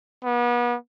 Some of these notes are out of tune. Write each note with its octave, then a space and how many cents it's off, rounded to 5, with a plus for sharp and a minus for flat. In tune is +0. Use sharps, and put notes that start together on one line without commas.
B3 -35